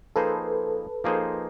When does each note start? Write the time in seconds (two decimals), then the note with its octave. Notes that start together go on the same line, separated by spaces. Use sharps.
0.16 F3 A#3 D#4 G#4 A4 B4 C5
1.04 F3 A#3 D#4 G#4 C5